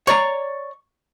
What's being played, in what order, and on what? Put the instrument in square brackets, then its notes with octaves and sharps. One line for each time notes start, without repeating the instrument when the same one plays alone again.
[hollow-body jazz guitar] C#5 D5 A#5 [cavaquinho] C#6